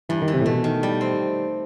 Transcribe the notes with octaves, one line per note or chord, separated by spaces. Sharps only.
G2 E3
D#3
E3
C3
A2
B2 A3
D#3
G3
C4